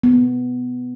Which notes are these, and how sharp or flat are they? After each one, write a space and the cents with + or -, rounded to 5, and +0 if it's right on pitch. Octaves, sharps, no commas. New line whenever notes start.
B3 +10